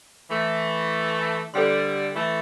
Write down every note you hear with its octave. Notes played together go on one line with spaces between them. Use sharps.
E3 A3
D3 G3 A4 C5 G5 C6
E3 A3